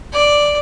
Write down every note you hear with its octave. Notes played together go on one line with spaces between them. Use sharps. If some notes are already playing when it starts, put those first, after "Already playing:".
D5